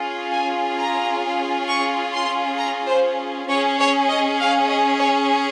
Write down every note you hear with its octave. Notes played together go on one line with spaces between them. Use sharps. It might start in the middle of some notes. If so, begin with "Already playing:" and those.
Already playing: C#4 F4 G#4
G#5
A#5
C#6
C6
A#5
C5
C#4 G#4 C#5
C#5
D#5
F5
D#5
C#5